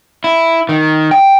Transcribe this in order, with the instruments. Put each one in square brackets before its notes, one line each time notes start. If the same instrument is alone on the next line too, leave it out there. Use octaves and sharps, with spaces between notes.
[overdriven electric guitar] E4
D#3
G5